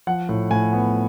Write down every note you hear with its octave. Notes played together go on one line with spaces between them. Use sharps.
F3 F#5
A2
A2 G#5
B3